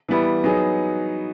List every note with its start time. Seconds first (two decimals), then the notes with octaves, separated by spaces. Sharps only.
0.09 E3 G3 B3 E4
0.44 F#3 B3 D#4 G#4